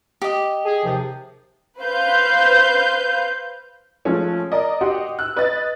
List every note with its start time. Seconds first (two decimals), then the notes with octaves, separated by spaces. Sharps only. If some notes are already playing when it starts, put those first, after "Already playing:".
0.22 G4 D#5
0.65 G#4
0.84 D#2 C3 F3
1.81 B4 C5 F5 G6
4.05 F3 G#3 A3 C#4
4.52 A#4 D5 D#5
4.81 F#4 G4 D#5 F#5 C6
5.19 E6 F#6
5.37 B4 D#5 F#6 A6